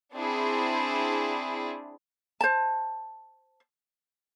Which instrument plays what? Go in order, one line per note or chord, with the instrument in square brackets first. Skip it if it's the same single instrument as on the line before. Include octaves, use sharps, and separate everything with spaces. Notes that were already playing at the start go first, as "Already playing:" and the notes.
[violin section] C4 D4 E4 G#4
[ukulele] C5 A5